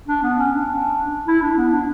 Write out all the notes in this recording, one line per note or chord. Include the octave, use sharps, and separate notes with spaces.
D4
B3
C#4
D4
E4
D4
B3
D4